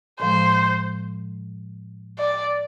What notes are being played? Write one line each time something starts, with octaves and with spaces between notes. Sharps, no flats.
A2 F3 G#3 C5
D5